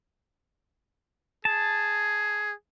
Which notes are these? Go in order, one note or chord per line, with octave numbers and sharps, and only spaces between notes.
G#4 A5